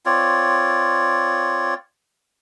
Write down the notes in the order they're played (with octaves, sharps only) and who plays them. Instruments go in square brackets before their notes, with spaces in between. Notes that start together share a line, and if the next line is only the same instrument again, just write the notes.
[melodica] C4 F4 C#5 D5